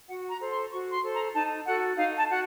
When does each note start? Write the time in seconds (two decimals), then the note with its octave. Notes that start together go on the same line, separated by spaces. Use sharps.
0.08 F#4 F#5
0.29 A#5
0.40 A4 C5
0.50 C6
0.71 F#4 C#6
0.92 C6
1.02 A4 C5
1.13 A#5
1.34 D#4 A5
1.65 F#4 A4 F#5
1.97 D#4 F5
2.18 A5
2.29 F#4 F#5